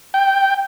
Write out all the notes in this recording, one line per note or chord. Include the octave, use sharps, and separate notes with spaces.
G5